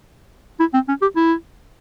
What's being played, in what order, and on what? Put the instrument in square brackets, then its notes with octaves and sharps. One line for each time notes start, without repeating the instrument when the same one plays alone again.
[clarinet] E4
C4
C#4
G4
E4